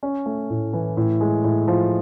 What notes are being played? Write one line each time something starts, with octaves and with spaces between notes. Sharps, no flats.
C#4
A3
A2
E3
A2
G#3
A2
F3